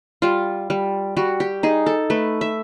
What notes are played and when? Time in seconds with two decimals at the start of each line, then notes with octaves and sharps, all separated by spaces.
0.22 G3 F4
0.70 G3
1.17 G3 F#4
1.40 G4
1.63 D#4 G#4
1.86 A4
2.10 A3 B4
2.41 E5